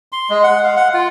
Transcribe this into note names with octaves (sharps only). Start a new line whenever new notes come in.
C6
G#3
F#5
F5
F#5
F4